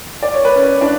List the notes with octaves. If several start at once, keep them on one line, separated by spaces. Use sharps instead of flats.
D5
C#5
B4
C#4 C#5
D4 D5